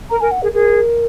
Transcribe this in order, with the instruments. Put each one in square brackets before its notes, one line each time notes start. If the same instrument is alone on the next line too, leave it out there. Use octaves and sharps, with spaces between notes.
[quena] A#4 [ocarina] A#5
[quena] A#4 [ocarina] G#5
[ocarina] F#5
[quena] G#4 [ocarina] A#4
[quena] G#4 [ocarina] A#4